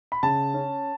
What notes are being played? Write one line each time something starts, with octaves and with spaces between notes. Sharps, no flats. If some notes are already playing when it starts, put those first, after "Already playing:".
B5
C#3 A5
C#4